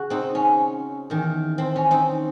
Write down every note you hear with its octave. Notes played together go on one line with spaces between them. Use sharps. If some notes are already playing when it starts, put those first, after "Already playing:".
Already playing: C#3 F#4 G#4
C4 D#4
C#4
E2 D#3
C4
C#4
C4 D#4